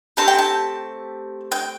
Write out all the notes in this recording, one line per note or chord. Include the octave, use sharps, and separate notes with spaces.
A3 C4 G4 A5
G5
A5
G5